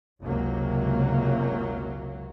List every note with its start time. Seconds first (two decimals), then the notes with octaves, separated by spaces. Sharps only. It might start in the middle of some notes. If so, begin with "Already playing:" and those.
0.22 F#1 C#2 C3 F#3 A#3